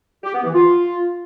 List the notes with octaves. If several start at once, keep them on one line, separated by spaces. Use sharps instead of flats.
G4
B3
E3
F4